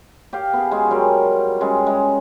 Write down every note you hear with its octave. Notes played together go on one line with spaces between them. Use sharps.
G4 F5
B3 G#4
G#3 F#4 G#5
F#3 G3 F4 A#4
C#3 G3 G#3
G#3